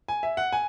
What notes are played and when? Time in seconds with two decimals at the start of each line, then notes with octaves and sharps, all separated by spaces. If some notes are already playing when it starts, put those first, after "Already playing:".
0.08 G#5
0.23 E5
0.37 F#5
0.52 G#5